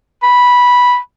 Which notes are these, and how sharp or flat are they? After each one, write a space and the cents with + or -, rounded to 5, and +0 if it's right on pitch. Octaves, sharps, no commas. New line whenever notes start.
B5 -10